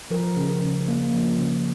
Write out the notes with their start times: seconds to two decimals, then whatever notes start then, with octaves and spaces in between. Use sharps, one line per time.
0.10 F3 A#4
0.36 C#3
0.61 C#3
0.88 A#3
1.13 F3
1.38 C#3